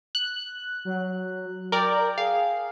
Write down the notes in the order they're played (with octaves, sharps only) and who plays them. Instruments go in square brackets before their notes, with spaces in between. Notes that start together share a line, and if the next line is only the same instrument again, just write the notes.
[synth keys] F#6
[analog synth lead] F#3
[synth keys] A#4 D5 [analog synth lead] G5
[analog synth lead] G#4 [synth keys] F5